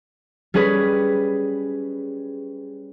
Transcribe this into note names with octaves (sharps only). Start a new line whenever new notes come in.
G3 C#4 G#4 B4